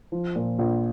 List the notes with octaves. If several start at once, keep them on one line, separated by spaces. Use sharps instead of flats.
F3
A#2
A#1